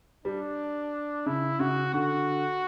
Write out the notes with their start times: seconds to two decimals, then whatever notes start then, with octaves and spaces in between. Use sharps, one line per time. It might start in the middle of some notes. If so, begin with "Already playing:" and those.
0.25 G3 D4
1.26 C#3 E4
1.60 C#3 F#4
1.93 D3 F#4